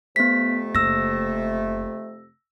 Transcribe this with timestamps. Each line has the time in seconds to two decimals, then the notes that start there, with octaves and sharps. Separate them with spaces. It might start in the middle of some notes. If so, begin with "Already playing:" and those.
0.16 F2 C3 A3 B3 B6
0.75 F#1 E6 A#6